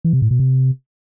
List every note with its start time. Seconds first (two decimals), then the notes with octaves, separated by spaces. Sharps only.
0.04 E3
0.13 C3
0.22 A2
0.31 B2
0.39 C3